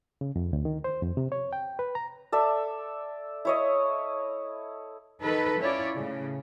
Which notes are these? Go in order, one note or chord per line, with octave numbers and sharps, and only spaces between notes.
C#3
F2
D2
D#3
C5
F2
C3
C#5
G5
B4
A#5
A4 D5 E5
E4 C#5 D#5
D#3 D#4 A4 B4
C#4 E4 F4 C#5 D5
A2 C#3